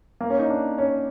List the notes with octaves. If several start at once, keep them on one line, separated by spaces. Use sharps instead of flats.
A#3
C#4
D#4
D4
C#4